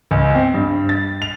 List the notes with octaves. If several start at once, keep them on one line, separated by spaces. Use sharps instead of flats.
C#2
C4
G2
A6
F7